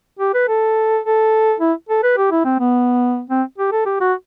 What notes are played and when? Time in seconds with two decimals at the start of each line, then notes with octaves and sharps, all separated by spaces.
0.19 G4
0.34 B4
0.49 A4
1.04 A4
1.60 E4
1.89 A4
2.03 B4
2.17 G4
2.31 E4
2.45 C4
2.59 B3
3.30 C4
3.58 G4
3.72 A4
3.86 G4
4.01 F#4